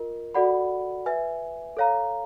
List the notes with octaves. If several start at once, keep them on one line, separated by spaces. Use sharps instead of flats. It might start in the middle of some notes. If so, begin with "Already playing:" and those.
Already playing: F4 A#4 D#5
F#4 A4 D5 F#5 B5
B4 E5 G#5
A4 C#5 F5 A#5